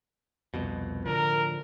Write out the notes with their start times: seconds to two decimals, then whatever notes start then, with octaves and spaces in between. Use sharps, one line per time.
0.54 C2 F2 B2
1.06 A2 D3 F3 A#4